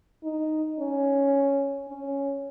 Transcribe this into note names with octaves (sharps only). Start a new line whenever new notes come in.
D#4
C#4
C#4